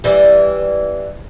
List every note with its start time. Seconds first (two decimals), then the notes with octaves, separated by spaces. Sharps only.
0.04 E3 G3